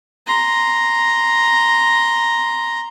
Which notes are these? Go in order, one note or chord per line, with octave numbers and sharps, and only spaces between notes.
A#5 C6